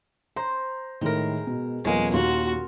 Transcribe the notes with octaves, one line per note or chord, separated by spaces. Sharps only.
C5 A#5
A2 D#3 G#3 A#4
B2
D#1 F3 G#3 A#3 B3 C#4
D#2 A#2 A#3 F4 F#4